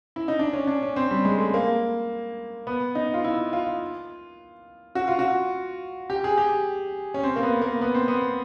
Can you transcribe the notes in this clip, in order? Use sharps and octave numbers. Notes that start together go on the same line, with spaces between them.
E4
D#4
D4
C#4
D4
C#4
C4
G3
G#3
A3
A#3
B3
D#4
F4
E4
F4
F#4
F4
F#4
G4
G#4
G4
C#4
C4
A#3
B3
A#3
B3
C4
B3